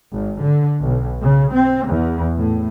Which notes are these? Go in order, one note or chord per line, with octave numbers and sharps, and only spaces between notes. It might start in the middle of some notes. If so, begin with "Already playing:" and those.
G#1
D3
B1
C#3
C4
E2
A2